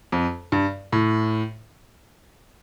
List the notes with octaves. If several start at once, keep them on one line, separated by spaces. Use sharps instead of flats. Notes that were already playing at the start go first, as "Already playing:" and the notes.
F2
G2
A2